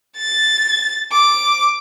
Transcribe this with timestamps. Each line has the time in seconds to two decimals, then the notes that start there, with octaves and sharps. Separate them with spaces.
0.17 A6
1.12 D6